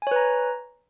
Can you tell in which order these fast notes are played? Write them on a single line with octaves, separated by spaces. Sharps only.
G#5 C#5 B4 A#5